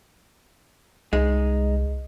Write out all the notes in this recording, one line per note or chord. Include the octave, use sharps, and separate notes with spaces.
C2 G#3 D#4